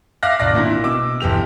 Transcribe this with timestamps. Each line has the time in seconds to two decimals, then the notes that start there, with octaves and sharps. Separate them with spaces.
0.23 E5 F5 D6 F6 F#6 A#6
0.40 G#1 D5 A#6
0.55 A#2 D3 E4
0.84 B2 D6 E6
1.20 G1 E3 G4 F7